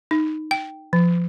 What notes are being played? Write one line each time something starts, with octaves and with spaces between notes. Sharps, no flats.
D#4
G5
F3